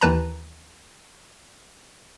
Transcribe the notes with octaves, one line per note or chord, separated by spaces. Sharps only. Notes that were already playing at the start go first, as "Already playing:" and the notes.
D#2 D#3 E3 B4 A5 A#5